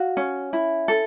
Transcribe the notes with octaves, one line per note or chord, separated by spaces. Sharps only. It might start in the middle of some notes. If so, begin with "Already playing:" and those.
Already playing: F#4 F5
C#4
E4
A4